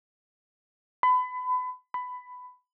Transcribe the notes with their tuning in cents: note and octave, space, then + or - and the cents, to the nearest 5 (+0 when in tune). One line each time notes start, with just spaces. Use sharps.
B5 +30
B5 +15